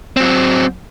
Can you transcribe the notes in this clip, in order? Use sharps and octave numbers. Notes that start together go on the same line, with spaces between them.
F#3 C4